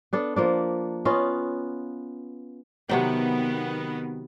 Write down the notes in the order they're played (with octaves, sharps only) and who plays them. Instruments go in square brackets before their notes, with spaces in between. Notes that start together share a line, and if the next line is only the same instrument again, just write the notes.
[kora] B3 D4 A4
F3 A#3 D4
B3 C#4 F4 D#5
[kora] C3 F#3 G5 [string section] D#3 B3